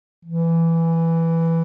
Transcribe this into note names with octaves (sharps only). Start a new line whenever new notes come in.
E3